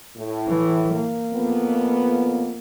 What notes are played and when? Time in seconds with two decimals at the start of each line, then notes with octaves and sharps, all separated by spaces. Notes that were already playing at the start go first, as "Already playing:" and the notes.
0.17 A2
0.47 E3
0.94 A#3
1.32 F2 B3